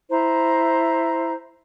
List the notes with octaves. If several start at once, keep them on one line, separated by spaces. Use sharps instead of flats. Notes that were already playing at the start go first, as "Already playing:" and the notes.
E4 C5 A#5